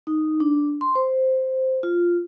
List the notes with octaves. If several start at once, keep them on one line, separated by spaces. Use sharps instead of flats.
D#4
D4
C6
C5
F4